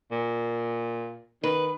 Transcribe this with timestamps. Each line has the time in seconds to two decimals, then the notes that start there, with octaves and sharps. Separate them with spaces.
0.12 A#2
1.43 D#3 B4